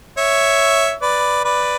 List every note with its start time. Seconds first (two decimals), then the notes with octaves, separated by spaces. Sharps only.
0.17 C#5 E5
1.01 B4 D5
1.44 B4 D5